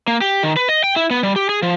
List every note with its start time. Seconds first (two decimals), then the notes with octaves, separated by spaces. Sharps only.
0.07 A#3
0.22 G4
0.43 D#3
0.57 B4
0.69 D#5
0.84 G5
0.96 E4
1.10 B3
1.23 G3
1.36 G4
1.49 G#4
1.62 F3